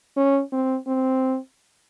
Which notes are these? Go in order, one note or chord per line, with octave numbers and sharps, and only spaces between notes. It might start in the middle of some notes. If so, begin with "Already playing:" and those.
C#4
C4
C4